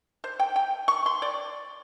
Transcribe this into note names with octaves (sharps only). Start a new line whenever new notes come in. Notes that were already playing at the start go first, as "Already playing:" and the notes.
C5
G5
G5
C#6
C6
D5